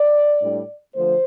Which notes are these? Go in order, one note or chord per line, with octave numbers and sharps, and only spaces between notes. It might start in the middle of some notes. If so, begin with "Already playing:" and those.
Already playing: D5
A2 G3 D4
D3 F3 A3 C5